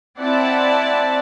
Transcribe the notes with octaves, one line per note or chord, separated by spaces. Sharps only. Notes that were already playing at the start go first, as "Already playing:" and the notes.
C4 E4 D5 F#5 A5